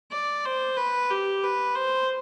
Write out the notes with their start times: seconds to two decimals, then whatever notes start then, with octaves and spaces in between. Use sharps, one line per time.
0.12 D5
0.45 C5
0.77 B4
1.11 G4
1.44 B4
1.75 C5